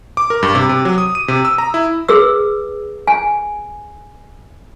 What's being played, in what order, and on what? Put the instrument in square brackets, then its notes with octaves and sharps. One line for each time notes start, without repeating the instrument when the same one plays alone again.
[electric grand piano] D6
A#4
G2
C3
C3
F#3
D#6
D#7
C3
E6
A#5
E4
[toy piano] G#4 B4 E6
G#5